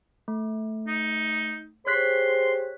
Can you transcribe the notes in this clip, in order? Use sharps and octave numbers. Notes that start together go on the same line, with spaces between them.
A3
D#4
G4 G#4 C5 C#5 C6 F#6 B6